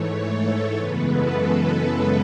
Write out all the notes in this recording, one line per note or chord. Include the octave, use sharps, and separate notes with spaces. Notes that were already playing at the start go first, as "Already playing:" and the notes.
Already playing: G#2 E3 A3 C#5
A4
F#2 C#3 E3 G#3 B3 B4
A4